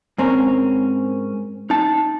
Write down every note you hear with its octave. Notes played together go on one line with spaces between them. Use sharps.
G#2 C4 C#4 A#4
D#4 A5